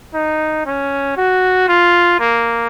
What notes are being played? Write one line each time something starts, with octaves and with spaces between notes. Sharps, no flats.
D#4
C#4
F#4
F4
A#3